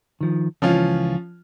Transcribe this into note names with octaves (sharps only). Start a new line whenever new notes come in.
D#3 F3
C#2 E3 F3 C#4 F4